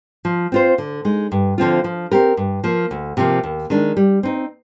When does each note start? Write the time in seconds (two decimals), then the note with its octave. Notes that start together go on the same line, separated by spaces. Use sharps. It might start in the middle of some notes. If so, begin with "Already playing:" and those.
0.25 F3
0.52 C4 F4 C5
0.78 D3
1.05 G#3 D#4
1.32 G2
1.58 D3 F3 C4 F4
1.84 F3
2.11 C4 G4 A#4
2.37 G2
2.64 F3 A#3
2.91 D2
3.17 C3 F3 A#3
3.44 D#2
3.70 D#3 G#3 D4
3.97 G3
4.23 C4 D#4